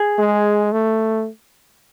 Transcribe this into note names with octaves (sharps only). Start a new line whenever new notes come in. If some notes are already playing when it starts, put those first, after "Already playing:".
Already playing: G#4
G#3
A3